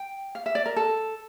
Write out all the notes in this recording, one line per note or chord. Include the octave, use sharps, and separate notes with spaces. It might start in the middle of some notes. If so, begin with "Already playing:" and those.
Already playing: G5
F5
E5
D5
A#4
A4